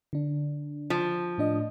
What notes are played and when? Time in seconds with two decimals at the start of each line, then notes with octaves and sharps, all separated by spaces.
0.13 D3 D4
0.90 F3
1.38 A2 D4 D#5